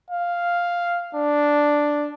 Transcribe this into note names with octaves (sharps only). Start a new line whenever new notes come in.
F5
D4